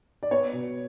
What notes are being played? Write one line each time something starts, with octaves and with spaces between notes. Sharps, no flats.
D5
B3 C#5
B2